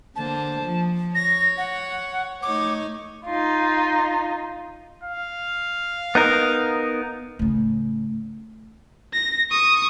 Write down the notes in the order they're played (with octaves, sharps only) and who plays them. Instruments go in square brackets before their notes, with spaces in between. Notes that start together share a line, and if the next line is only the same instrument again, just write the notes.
[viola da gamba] D3 A#3 C5 [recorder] A5
[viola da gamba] F3
[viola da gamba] C#5 [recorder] A#6
[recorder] F#5
[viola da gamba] A3 D#4 C#5 [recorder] D6
[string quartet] D#4 F4
[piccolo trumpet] F5
[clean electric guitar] B3 D#4 A#4
[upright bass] A2 C#3
[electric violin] A#6
C#6 D#6